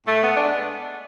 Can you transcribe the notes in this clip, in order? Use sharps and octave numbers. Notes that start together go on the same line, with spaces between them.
A2 A3
B3
G#3 D4